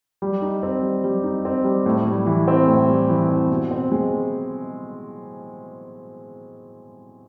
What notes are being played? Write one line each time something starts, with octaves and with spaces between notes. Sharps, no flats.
G3
D#4
C4
G3
G3
D#4
C4
G3
A2
G3
E3
C4
A2
G3
E3
C4
B2
C4
G#3